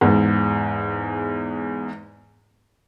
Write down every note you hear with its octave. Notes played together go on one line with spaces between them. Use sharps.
E2 G#2